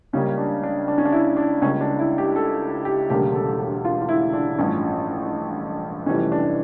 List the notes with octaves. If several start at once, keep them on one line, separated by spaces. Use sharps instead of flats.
C#2 C#3 G3 A#3 C#4
D4
D4
D4
C#4
D4
E4
D4
C#2 C#3 G3 A#3 C#4
D4
E4
G4
A4
G4
E1 D2 C#3 G3 A#3 G4
A4
G4
F4
F4
E4
D4
A1 G2 F3 C#4
F1 F2 E3 G3 C#4
D4